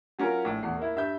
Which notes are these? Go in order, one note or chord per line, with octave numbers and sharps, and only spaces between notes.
F#3 C#4 F4 A#4
A#1 A2
E2 A3 C7
A#3 E4
G2 E5 G6